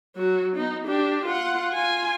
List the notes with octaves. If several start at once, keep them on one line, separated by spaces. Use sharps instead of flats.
F#3 F#4
B3 D#4
D4 G4
F4 F#5
F4 G#5